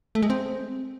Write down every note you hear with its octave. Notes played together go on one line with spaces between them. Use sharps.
A3
G#3
C4